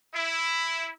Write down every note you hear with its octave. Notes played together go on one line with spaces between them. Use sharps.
E4